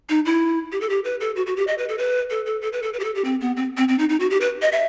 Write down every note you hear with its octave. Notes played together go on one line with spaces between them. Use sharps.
D#4
E4
G4
A4
G4
B4
A4
F#4
F#4
G4
D#5
B4
A4
B4
A4
A4
A4
B4
A4
B4
G4
A4
G4
C4
B3
C4
C4
C4
D#4
D#4
F#4
G4
B4
D#5
E5